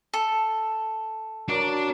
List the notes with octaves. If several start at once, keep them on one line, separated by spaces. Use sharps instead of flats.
A4
F#3 D4 A#4 D5